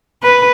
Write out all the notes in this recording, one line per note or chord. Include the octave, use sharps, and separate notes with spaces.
B4